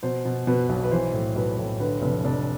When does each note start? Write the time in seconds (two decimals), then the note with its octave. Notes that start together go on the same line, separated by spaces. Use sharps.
0.03 B2 C5
0.25 B2
0.47 B2 B4
0.69 B1
0.83 B4
0.91 E3 C5
1.14 A2
1.36 B1 B4
1.58 A2
1.80 D3 B4
2.02 F1 B4
2.24 F1 D4